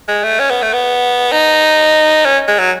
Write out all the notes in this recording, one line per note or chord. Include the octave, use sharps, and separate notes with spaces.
G#3
A3
C#4
B3
A3
B3
D#4
C#4
G#3
F#3